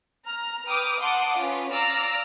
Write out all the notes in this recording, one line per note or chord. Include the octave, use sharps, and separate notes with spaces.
A#5 F6
B4 G5 D6 D#6 F6
F#5 A5 C6 D6 D#6
C#4 F4 B4
D5 F5 A#5 D6 E6 F6